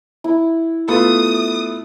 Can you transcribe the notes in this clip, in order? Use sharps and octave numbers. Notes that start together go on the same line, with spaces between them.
E4
A3 B3 F4 D#6